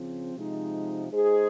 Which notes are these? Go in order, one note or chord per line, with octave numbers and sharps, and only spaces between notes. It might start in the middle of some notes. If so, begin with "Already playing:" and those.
Already playing: C#3 F3 C4
C3 F3 G#3 D#4
G#3 D#4 G#4 C5